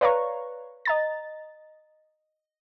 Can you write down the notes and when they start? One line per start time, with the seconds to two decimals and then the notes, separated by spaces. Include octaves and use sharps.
0.01 B4 C#5 D5 F5 A#5 C#6
0.85 D#5 A#5 A6